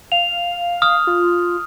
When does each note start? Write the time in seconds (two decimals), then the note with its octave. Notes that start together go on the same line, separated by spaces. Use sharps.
0.12 F5 F7
0.82 D#6 F6
1.07 F4